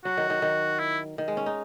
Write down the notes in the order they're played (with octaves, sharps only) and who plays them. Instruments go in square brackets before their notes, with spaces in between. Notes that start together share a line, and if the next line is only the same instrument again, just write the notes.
[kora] F#3 [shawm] F#4
[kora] D#3
D#3
D#3
[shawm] E4
[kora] D#3
G#3
C#4
D#4